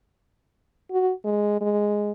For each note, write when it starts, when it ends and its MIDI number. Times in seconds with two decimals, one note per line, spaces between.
0.91 1.12 66
1.24 1.57 56
1.61 2.12 56